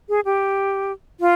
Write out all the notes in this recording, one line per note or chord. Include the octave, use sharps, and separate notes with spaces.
G#4
G4
F4